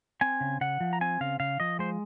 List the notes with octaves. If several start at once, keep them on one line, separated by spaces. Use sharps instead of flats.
C4 G#5
C#3
C#3 F#5
F3
A#5
C4 G#5
C#3 F5
C#3 F5
F3 D#5
G#3 C5